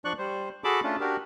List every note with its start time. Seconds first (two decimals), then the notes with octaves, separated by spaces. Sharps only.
0.05 F3 D4 D5 C#6 F#6
0.18 G3 C5
0.64 F#4 G#4 A4 A5 B5 D6
0.83 A3 C#4 D4 F4
1.00 D4 F#4 G4 A#4